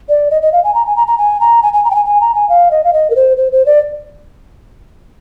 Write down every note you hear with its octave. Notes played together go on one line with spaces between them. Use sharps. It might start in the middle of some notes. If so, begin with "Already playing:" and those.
D5
D#5
D#5
F5
G#5
A#5
G#5
A#5
A#5
G#5
A#5
G#5
G#5
A#5
G5
G#5
G#5
A#5
G#5
F5
D#5
F5
D#5
A#4
C5
C5
C5
D5